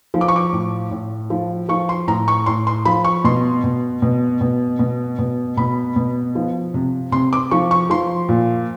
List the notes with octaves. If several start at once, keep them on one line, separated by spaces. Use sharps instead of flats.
F3
D6
C#6
D6
A2
A2
F3
F3 C#6
C6
A2 A#5
C#6
A2 C6
C6
F3 B5
C#6
B2 C6
B2
B2
B2
B2
B2
B2 B5
B2
F3
C3
C3 C6
D6
F3 C#6
C#6
F3 C6
A#2